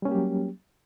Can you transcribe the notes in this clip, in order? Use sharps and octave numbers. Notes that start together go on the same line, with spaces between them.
F#3 G3 A#3 C#4 G4